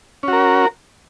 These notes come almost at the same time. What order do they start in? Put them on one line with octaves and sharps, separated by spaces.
C#4 F#4 A#4